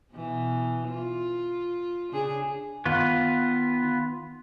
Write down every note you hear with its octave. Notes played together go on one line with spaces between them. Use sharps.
B2 E3
F4
C#3 D4 G#4
D#3 B3 F4 B4